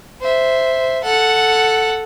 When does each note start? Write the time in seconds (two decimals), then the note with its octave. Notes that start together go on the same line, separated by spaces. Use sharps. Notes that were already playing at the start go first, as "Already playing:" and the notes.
0.21 C5 E5
1.04 A4 F#5